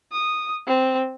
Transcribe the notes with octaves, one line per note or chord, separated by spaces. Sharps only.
D#6
C4